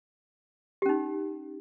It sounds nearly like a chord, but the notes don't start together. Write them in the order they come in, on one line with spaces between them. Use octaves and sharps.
G4 C#4 D#4